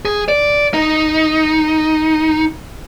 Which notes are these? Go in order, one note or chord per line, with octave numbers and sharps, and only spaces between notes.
G#4
D5
D#4